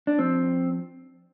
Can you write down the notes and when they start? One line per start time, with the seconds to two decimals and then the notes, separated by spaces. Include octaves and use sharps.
0.07 D4
0.18 F3 C4